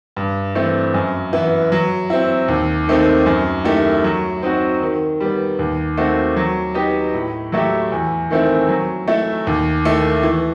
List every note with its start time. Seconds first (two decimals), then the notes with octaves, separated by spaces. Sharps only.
0.16 G2
0.55 E3 A3 C4
0.94 F#2
1.33 E3 B3 E4
1.72 F#3
2.10 C4 E4
2.48 D#2
2.88 D#3 A3 C4 D#4
3.26 F#2
3.65 D#3 A3 E4 G4
4.04 F#3
4.42 C4 D#4 F#4
4.82 D#3
5.20 G3 B3
5.59 D#2
5.97 D#3 A3 C4 F#4
6.36 F#3
6.74 B3 D#4 G4 D#5
7.14 A2
7.52 F#3 A3 E4 G4
7.92 E2
8.30 D#3 A3 C4 E4
8.69 F#3
9.08 A3 E4
9.47 D#2
9.85 D#3 A3 E4
10.23 E3